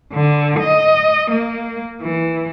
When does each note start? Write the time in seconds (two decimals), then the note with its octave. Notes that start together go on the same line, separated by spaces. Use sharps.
0.13 D3
0.60 D#5
1.31 A#3
2.02 E3